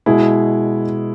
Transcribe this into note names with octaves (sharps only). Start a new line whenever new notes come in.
B2 G#3 E4 G#4